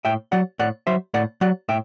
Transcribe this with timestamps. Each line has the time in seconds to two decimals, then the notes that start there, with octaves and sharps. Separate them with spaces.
0.05 A2 E5 G5
0.32 F#3 D5 F#5
0.59 A2 D5 F#5
0.87 F#3 C5 E5
1.14 A2 D5 F#5
1.41 F#3 D5 F#5
1.69 A2 E5 G5